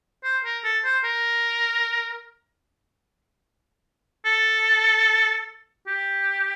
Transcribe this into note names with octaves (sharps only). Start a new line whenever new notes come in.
C5
A#4
A4
C5
A#4
A4
G4